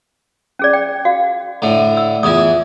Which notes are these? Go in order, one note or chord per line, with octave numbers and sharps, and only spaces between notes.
C#4 G#4 D5
G5
F#4 F5
A2 D3
E6
E2 E3 F4 G#5 D#6